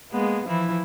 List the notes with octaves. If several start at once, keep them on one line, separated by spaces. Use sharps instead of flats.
G#3 A#3 B3
E3 F3 E4